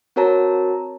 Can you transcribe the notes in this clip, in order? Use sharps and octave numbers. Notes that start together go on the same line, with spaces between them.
C4 F#4 A#4 C#5 A5 A#5